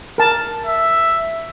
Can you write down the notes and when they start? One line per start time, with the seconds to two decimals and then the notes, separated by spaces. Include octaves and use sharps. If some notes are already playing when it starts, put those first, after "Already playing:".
0.18 A#4 A5
0.66 E5